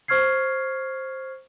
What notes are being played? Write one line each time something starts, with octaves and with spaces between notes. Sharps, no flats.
C5 C#6 F6 G#6 C7